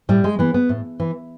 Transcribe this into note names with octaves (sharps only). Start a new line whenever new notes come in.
A2 G3
G#3
E3 B3
B3
A2
E3